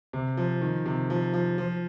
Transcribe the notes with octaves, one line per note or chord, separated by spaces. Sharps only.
C3
F3
D#3
C3
F3
F3
F3